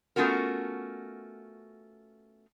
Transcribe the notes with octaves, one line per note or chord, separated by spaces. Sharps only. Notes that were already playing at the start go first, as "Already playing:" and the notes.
A3 B3 C#4 F4 F#4 A#4